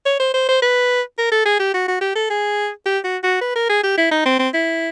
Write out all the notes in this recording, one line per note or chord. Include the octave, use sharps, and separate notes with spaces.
C#5
C5
C5
C5
B4
A#4
A4
G#4
G4
F#4
F#4
G4
A4
G#4
G4
F#4
F#4
B4
A#4
G#4
G4
E4
D#4
C4
C4
E4